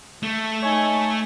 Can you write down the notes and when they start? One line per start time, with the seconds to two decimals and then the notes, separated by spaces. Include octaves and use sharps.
0.23 A3
0.63 D#4 C#5 G#5